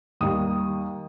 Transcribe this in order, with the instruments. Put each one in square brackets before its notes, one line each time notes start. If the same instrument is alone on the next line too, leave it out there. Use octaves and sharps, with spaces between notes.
[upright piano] D#2 D#3 G3 D#6